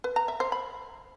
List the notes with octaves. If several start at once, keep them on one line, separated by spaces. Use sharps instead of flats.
B4
A#5
E5
C5
B5